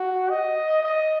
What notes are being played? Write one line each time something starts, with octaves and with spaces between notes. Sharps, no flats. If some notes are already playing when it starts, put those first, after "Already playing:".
Already playing: F#4
D#5
D#5